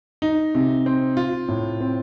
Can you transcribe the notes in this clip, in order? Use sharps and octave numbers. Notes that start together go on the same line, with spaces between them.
D#4
C3
C4
F4
A2
C4